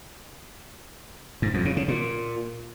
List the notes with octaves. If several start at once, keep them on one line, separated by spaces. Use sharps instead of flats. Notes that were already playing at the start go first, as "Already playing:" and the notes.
G#2
F2
C#3
C#3
A#2